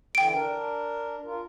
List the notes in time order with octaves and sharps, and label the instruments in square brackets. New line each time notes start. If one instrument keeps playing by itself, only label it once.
[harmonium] D3 E3 [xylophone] G5 D7
[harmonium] D4 A#4
F4 A#4